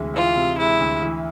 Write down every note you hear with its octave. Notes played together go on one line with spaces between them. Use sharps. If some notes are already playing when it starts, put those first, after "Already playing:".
Already playing: D2 C3 E3 G#3
E3 F4
C3
G#3 E4
D2
E3